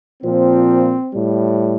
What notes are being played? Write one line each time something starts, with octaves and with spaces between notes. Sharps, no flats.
A#2 F3 C4
A2 G3